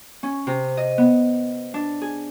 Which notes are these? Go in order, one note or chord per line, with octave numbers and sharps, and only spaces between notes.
C#4
C3
D#5
B3
D4
G#4